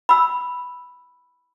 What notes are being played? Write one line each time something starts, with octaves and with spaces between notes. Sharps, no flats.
B5 E6